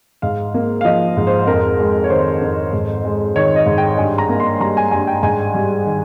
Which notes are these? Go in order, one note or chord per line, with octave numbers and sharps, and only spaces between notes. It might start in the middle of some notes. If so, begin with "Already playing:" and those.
G#2 F5
A#3
F5
F3 D#5
G#2
C5
F2 A#4
G#3
C#5
D#3 C5
F2
G#2
G#3
D#3 C#5
D#5
G#2
G5
G2 G#5
A#5
A#3
C6
G3 A#5
G#5
G2 G#5
G5
G#2 G#5
G3
D#3